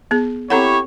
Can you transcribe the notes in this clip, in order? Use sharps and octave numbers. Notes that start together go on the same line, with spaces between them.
B3 G#4
C4 E4 G4 A4 C#5 F#5